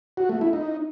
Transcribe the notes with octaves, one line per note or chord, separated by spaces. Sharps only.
F#4
A3
E4
D#4